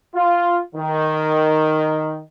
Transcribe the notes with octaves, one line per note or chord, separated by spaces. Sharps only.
F4
D#3